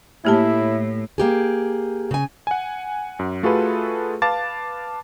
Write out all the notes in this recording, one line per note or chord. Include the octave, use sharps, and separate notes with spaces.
A2 A#3 E4 G4 A5
A#3 G4 G#4
C#3 G#5
F#5 G#5
F#2
A3 F4 F#4 G#4 A4 B4
B4 F5 A5 D6 A6